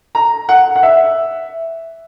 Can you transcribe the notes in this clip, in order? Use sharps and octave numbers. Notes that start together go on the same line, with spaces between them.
A#5
F#5
F#5
E5